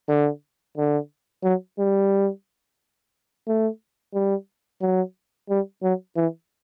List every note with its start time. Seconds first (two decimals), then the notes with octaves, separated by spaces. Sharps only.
0.09 D3
0.77 D3
1.44 F#3
1.79 G3
3.47 A3
4.14 G3
4.81 F#3
5.50 G3
5.83 F#3
6.16 E3